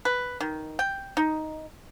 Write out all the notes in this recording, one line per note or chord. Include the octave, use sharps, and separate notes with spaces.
B4
D#3
G5
D#4